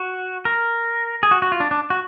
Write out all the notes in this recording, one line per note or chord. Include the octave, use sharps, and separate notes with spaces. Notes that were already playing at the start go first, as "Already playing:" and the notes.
Already playing: F#4
A#4
G#4
F#4
F#4
F4
D4
D4
F#4